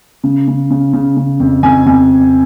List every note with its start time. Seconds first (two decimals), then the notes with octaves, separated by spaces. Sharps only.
0.24 C#3
0.48 C#3
0.70 C#3
0.93 C#3
1.17 C#3
1.40 F2
1.63 F2 G#5
1.86 F2 G#5